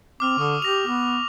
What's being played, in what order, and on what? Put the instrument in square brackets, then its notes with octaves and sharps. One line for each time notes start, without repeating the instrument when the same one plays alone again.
[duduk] C4 [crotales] D6 F6 F7
[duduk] D3 [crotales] C#6 D#6
[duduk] G4 [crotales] A#6 F7
[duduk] B3